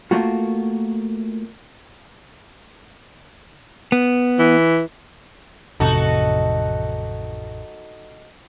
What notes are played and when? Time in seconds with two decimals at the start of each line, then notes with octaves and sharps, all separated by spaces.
0.11 A3 A#3 F4 F#4
3.92 B3
4.39 E3
5.80 A1 F2 C3 D#4 F#4 A4